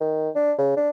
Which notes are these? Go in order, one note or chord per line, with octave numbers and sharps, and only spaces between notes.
D#3
D4
C#3
D4